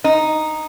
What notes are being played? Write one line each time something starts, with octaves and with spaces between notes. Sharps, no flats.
D#4